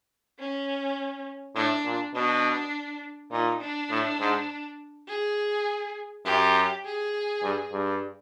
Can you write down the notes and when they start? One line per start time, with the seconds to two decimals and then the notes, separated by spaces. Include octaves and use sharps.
0.39 C#4
1.55 A2 D4
1.85 A#2
2.15 B2 D4
3.31 A#2 D#4
3.61 D4
3.90 A2
4.20 G#2
5.08 G#4
6.25 F#2 G4
6.85 G#4
7.43 G2
7.72 G2